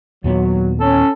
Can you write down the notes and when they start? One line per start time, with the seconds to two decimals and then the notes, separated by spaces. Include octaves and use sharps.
0.24 D#2 A#2 F#3 B3
0.80 C#4 A4